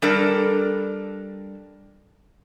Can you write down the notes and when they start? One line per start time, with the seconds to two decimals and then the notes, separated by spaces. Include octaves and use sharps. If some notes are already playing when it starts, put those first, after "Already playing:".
0.02 G3 D4 A4 A#4